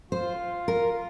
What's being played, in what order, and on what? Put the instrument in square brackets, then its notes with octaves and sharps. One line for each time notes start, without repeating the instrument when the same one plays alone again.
[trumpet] F4 [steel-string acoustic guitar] C5
[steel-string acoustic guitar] A#4